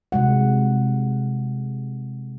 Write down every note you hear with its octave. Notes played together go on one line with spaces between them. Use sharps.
C3 G#3 F#5